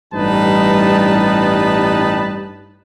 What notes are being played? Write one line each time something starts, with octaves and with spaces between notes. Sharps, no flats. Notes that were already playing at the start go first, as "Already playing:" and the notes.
A1 G2 G3 D#4 B4 A5